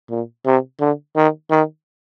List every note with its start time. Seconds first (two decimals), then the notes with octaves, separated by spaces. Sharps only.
0.10 A#2
0.46 C3
0.80 D3
1.16 D#3
1.50 D#3